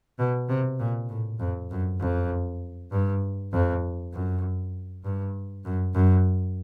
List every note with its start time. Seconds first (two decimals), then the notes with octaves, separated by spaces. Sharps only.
0.19 B2
0.49 C3
0.80 A#2
1.09 A2
1.40 F2
1.71 F#2
2.00 F2
2.92 G2
3.53 F2
4.13 F#2
5.04 G2
5.65 F#2
5.95 F#2